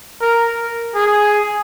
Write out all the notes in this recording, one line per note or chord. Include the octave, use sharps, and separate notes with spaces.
A#4
G#4